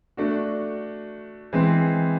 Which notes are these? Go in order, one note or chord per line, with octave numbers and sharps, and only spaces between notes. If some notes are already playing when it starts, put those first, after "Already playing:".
A3 D4 F#4
E3 G#3 C4